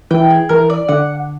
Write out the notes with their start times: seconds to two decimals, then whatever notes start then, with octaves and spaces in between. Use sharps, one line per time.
0.11 E3 G5
0.30 G#4
0.49 E3 A#4
0.70 D5
0.89 D3 F#5